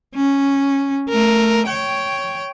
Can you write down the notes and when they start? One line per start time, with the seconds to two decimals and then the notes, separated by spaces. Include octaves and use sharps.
0.15 C#4
1.09 A3 A#4
1.67 C#5 G5